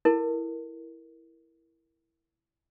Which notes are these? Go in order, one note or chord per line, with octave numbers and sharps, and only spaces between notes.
E4 A4 A#4